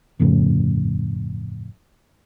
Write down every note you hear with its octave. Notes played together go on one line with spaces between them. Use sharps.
G1 F2 A2 C#3